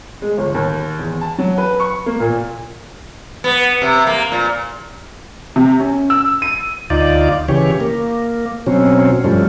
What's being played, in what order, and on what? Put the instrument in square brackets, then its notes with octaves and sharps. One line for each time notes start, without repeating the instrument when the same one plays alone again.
[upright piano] G#3
G1
D#2
E2
A5
F#3
B4
C#6
A#3
A#2
[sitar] B3
C3
A#3
A#2
[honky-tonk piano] C3
C#4
E6
D#7
[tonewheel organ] D2 D#4 F4 D5
C#3 E3 G4 C#5
A#3
B2 F#3 C4 C#4
G2 F3 G3 A3 C#4